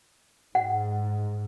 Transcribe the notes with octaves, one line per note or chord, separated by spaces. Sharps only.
G#2 F#5